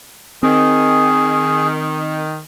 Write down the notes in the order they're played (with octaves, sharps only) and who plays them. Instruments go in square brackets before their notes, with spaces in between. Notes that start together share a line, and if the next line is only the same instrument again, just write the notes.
[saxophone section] D#3 [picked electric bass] C4 [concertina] G#4